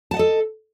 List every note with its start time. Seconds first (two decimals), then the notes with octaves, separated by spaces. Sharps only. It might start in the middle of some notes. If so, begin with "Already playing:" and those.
0.11 A5
0.14 F#5
0.17 D#5
0.19 A4